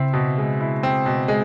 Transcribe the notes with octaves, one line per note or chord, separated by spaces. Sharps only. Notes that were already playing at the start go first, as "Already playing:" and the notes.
Already playing: C#3 C4 E4
B2
G#3
E4
C4
B2
G#3